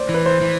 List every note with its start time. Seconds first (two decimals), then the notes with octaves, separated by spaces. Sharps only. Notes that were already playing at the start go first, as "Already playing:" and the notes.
Already playing: C5 D5
0.09 E3
0.14 B4
0.26 C5
0.41 E3